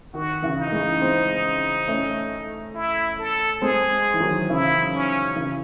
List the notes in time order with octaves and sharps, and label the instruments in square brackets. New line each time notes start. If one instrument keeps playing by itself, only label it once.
[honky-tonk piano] D#3 [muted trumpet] F#4
[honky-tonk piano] C#3 E3
[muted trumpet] D#4
[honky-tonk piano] E3 G#3
G#3 C4
A3 C#4
[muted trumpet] E4
A4
[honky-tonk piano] G#3 C4 [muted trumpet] G#4
[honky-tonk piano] E3
D#3 F#3
[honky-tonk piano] C#3 E3 [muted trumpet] E4
[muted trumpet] C#4
[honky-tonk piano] C#3 E3